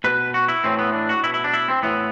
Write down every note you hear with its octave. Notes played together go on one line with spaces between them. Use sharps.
B2 B4
F#4
E4
A2 E3 C4
B3
D4
F#4
B2 E4
E4
D4
E4
C4
A2 E3 B3